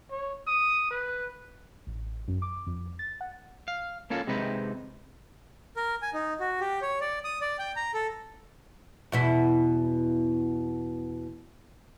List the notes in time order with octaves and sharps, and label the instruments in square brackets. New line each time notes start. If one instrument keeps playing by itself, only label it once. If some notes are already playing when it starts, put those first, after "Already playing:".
[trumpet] C#5
D#6
B4
[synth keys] A1
F#2
D6
F2
A6
F#5
[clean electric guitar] F5
A#3 C#4 F4 A4
C3 G#3 C4 D#4 B4
[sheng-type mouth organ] A#4
G#5
D#4
F#4
G4
C#5
D5
D#6
D5
G5
A#5
A4
[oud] E2 B2 E4